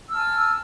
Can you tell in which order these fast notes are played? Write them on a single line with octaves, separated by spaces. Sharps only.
E6 F6 A5 G#5